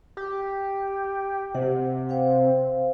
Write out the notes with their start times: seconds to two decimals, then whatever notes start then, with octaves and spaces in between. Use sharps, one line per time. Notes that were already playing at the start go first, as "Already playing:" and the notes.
0.17 G4
1.55 C3 F#5
2.09 C5 F5 G5